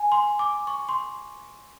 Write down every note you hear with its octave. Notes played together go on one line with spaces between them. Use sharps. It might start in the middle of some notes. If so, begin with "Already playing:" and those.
Already playing: G#5
C6
D6
C#6
C6